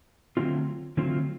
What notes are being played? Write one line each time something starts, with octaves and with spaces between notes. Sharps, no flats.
D3 F#3 A3 C4 F4
D3 F#3 A3 C4 F4